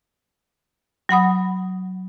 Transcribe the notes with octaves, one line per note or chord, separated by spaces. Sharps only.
F#3 F#5 B5 D#6